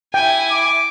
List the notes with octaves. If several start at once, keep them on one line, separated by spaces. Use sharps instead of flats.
E4 G5 G#5
D6